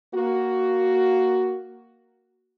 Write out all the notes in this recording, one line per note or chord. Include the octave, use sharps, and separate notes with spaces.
A#3 F#4